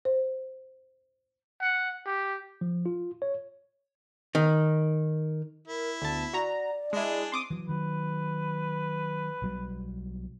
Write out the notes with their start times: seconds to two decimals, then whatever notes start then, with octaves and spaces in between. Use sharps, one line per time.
0.05 C5
1.62 F#5
2.06 G4
2.61 F3
2.86 F4
3.22 C#5
4.35 D#3
5.68 E4 A#4
6.02 D2 B3 A5
6.33 F#4 D5 A#5
6.93 G#3 D4 E4 G#4
7.32 C4 C6 D6 D#6
7.51 E3 F#3
7.69 D#3 F#3 B4
9.42 B1 F#3 G3